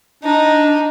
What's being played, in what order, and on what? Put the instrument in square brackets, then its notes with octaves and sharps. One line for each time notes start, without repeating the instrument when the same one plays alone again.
[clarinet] D4 [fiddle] D#4